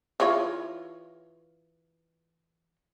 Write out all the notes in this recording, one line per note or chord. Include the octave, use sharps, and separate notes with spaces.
E3 F4 C#5